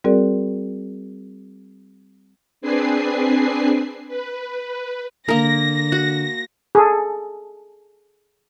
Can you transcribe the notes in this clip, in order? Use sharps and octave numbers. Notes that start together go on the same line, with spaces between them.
G3 C4 F#4 G#4 A#4 D5
C4 D4 G#4 B4 G#5 C7
B4
D3 A#3 A#4 A#6
F#4
G#4 A4